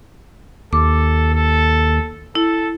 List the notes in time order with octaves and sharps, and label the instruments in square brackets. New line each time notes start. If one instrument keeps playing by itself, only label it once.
[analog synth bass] D#2 [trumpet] A4 [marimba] D6
[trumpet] A4
[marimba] E4 [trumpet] A4